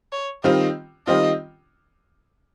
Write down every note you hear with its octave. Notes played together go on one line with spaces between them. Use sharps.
C#5
D#3 G3 C4 F4 D#5
D#3 G3 C4 F4 D#5